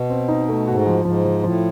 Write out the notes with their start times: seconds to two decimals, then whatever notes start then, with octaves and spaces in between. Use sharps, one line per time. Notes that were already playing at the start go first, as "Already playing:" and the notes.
Already playing: B2
0.10 C4
0.29 D#4
0.49 A3
0.67 G#2 F#4
0.87 F3
1.05 G#2 F3
1.25 F3
1.44 A2 F3